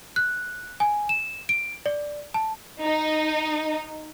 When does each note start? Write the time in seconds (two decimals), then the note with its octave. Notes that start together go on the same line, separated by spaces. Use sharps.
0.16 F#6
0.80 G#5
1.09 E7
1.49 D7
1.86 D5
2.34 A5
2.83 D#4